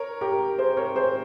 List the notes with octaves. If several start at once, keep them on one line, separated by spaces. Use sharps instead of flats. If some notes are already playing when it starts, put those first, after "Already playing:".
Already playing: A#4 C#5
G4 A#4
G#4 C5
A#4 C#5
G#4 C5